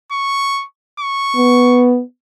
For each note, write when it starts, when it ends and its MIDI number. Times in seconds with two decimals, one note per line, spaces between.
0.12 0.65 85
1.00 1.91 85
1.36 2.01 59